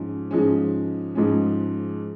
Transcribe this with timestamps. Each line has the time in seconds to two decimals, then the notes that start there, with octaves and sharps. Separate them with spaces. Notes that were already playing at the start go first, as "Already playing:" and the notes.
Already playing: G#2 F3 C#4
0.31 G#2 F3 G#3 C#4
1.15 G#2 F3 G#3 C#4